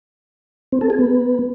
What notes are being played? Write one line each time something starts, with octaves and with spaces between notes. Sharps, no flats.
C4
A4
G#4
B3